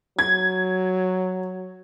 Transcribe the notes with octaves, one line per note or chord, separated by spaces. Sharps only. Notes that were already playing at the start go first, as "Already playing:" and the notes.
F#3 G#6